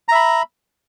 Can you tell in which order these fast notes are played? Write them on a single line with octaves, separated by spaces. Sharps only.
A#5 E5 B5